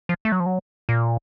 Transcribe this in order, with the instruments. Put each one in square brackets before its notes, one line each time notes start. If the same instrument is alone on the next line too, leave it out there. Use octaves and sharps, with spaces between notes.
[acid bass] F3
A3
F#3
F3
F#3
A#2